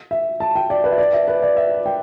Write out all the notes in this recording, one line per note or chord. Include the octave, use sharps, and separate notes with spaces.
E5
A5
G5
D5
B4
E5
D5
E5
B4
D5
E5
G5